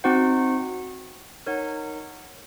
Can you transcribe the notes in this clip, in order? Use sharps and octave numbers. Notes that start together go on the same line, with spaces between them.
C4 D#4 F#4 C5 F#5
D#4 A#4 C#5 F#5